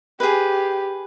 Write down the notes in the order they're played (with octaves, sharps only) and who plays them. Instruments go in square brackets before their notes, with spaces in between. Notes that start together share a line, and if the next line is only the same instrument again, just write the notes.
[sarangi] G4 [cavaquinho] G#4 B4